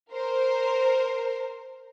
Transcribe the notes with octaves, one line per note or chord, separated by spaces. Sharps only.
A#4 C5